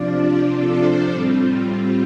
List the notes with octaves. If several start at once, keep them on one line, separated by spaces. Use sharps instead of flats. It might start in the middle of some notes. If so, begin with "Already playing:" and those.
Already playing: C3 F3 D4 F4 D5
A4
C5
A2 G3 C4 F4 A4